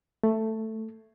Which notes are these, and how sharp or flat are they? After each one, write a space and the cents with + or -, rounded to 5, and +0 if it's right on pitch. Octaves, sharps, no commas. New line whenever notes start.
A3 +5